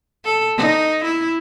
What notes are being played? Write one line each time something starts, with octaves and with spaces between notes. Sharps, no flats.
A4
D#4
E4